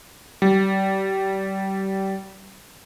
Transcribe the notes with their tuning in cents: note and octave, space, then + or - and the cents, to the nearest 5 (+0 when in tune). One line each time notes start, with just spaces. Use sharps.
G3 -25